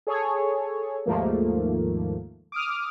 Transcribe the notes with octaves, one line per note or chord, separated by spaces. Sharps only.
G#4 A4 C#5
D#2 G#2 F3 A3 A#3
D6 D#6 F6